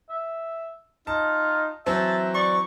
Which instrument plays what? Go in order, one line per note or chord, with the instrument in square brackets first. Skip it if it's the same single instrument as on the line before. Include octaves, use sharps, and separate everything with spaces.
[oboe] E5
[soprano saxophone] D#4 [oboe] F4 [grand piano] A5
[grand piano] E3 F#3 C4 [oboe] E5 [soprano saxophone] A5
[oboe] D5 [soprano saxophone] C#6